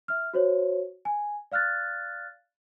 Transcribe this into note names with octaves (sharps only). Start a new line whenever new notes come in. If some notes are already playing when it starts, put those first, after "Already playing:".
E5 F6
F#4 C5 C#5
G#5
D5 F5 F6 F#6 A6